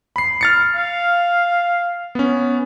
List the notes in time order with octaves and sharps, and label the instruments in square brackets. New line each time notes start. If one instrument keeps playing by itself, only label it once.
[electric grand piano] B5 C7
F6 A6 C#7
[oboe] F5
[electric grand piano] B3 C#4